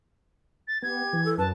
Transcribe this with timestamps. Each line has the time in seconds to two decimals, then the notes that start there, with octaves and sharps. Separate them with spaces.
0.67 A6
0.82 B3 G4 G#6
1.13 E3
1.25 A4
1.38 F#2 B4 A5